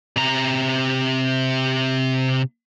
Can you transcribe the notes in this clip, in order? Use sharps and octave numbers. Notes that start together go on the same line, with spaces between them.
C3 A#5